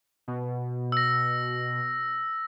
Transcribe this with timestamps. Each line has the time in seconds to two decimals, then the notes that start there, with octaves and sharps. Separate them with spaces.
0.28 B2
0.92 E6 A#6